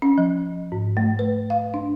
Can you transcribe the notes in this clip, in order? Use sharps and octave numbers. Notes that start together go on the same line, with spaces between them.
C#4
F3
G#2
A3
B4
F5
D4